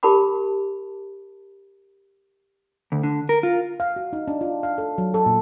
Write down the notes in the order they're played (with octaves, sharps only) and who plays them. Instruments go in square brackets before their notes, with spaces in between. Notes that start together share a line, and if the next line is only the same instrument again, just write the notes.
[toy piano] G4 A#4 A5 B5 D6
[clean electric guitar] D2
D3
A#4
F4
[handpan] F5
F#4
D#4
D4
F4
F5
A4
F#3
A4
A#2